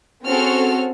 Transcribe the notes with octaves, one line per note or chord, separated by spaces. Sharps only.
C4 C#4 F#4 G#4 A4 F6